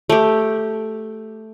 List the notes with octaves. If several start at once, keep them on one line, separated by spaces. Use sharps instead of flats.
A3 G4